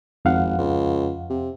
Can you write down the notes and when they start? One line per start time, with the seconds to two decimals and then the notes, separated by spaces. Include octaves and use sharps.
0.25 G#1 F2 F5 F#5
0.58 C#2
1.30 C3